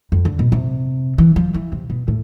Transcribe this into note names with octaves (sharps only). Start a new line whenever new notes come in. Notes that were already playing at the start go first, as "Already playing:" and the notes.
F2
D3
B2
C3
E3
F3
E3
C3
B2
A2